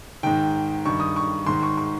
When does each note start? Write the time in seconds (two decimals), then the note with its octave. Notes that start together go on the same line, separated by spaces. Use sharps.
0.23 G#2 D#3 G5
0.85 G2 D#3 C#6
1.00 D#6
1.16 C#6
1.46 G#2 D#3 C6
1.63 C#6
1.78 C#6